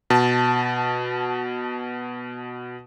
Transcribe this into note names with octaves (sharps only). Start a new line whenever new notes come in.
B2 A5